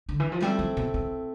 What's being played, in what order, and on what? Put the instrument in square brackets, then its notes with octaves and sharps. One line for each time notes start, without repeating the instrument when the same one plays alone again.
[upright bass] D3
E3
F3
[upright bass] G3 [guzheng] A3 C4 E4
[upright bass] F3
B2
B2